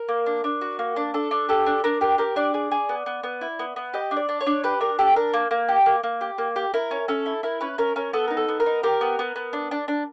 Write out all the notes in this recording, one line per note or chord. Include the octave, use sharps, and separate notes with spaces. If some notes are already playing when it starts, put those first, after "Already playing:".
Already playing: A#4
A#3
D4
D4
F#4
A#3
D4
D4 A4
D4
G4 A4
D4
D4 A#4
G4 A#4
G4 A#4
D4 D5
G#4
G#4
B3
B3
B3
E4
B3
B3
G4 D#5
D4
D5
D4
C#5
D4
G4 B4
D4 A#4
G4 A4
D4 A#4
A#3
A#3
G4
A#3
A#3
G4
A#3
G4
E4 A#4
C#4
C#4 A4
E4
E4 A#4
C#4 B4
C#4 A#4
C#4 A#4
B3 A4
D#4 A#4
A4
B3
A#4
D#4
G4 A#4
B3
B3
B3
D4
D4
D4